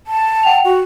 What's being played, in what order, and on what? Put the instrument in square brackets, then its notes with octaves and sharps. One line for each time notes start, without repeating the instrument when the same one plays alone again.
[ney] A5
[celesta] F#5 G5 F7
[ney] F#4